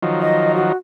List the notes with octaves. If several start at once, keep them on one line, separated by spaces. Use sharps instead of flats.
D#3 F3 F#3
D#5
F#4